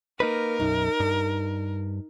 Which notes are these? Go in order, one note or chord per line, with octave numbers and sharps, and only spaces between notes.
A#3 D#4 A#4 B4
B1 F#2 D#4
G2